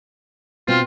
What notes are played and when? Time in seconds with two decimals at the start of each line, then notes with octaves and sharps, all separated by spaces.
0.68 B2 C4 F4